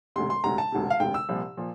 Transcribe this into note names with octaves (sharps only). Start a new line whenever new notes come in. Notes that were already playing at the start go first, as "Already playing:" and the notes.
E1 D2 C3 C6
C6
E1 D2 C3 A#5
A5
E1 D2 C3
F5
E1 D2 C3 G5
E6
C2 A#2 F3
A#2 F3